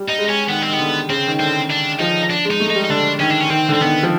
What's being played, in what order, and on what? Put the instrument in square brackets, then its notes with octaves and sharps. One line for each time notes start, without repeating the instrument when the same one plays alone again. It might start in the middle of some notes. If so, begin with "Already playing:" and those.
Already playing: [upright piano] G3
[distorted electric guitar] D#4
[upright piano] G#3
[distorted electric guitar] C#4
[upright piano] D#3 [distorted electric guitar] B3
[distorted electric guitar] C4
[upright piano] D#3 [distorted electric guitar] B3
[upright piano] D3
[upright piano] C#3 [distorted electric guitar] C4
[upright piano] D#3
[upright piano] D3 [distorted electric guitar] C4
[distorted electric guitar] D4
[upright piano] F3 [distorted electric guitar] D#4
[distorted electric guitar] D4
[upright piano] G#3
[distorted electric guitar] D#4
[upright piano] A3
[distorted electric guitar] D#4
[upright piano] G3
[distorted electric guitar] D#4
[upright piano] D3 [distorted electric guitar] D4
[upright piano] D#3 [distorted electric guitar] C#4
[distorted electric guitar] D4
C#4
[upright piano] D#3 [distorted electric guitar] C4
[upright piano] D3 [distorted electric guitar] C4
[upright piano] D#3 [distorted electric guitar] B3
[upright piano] F3